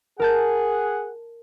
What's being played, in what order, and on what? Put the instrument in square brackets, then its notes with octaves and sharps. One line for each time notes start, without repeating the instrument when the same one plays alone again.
[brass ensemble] G#4 F#5 [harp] A#4 A5 G6